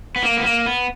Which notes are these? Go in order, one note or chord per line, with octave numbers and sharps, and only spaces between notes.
B3
A#3
B3
A#3
B3